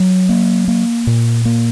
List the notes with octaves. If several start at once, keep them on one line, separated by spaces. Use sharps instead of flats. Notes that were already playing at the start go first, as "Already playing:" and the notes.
Already playing: F#3
A#3
A#3
A#2
A#3